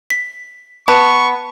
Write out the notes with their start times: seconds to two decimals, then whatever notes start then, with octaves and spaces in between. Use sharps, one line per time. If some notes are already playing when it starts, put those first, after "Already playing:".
0.10 B6
0.88 B3 A5 C#6